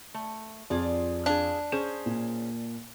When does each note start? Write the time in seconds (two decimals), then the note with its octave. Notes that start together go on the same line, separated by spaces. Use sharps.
0.14 A3
0.70 F2 F4 G#4 D5
1.26 D4 G#4 F5
1.72 C#4 G#4 C5 E7
2.06 A#2